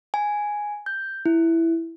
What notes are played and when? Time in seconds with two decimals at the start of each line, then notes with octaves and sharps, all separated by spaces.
0.14 G#5
0.86 G6
1.26 E4